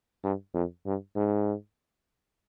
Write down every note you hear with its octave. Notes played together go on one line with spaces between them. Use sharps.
G2
F2
G2
G#2